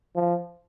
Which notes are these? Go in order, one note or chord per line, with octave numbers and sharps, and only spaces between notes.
F3